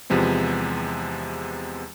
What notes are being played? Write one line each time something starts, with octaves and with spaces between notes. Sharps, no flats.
E2 C3 F3 G#3 B3